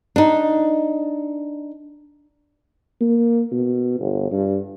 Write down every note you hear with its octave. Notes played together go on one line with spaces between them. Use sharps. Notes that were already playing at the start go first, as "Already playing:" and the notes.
D4 D#4
A#3
B2
G1
G2